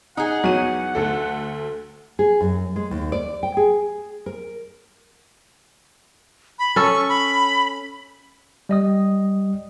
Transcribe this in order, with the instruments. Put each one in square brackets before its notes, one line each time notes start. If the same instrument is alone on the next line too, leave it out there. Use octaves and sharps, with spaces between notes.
[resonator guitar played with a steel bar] D#4 G#4 [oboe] F#5 [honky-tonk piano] A#5
[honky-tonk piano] E2 D#7 [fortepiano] F#3
[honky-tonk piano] D2 A4
[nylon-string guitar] G#4
F#2
G#3
D#2
D5
G5
G#4
A#4
[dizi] B5
[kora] C#4 A4 [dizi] C#6
[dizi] B5
[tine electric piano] G3 D#5 D#6